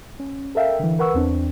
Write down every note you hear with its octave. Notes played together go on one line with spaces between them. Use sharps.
C#4
A4 A#4 E5 F5 G5
D3 E3
A#4 B4 F#5 C#6 E6
E2 C4 D4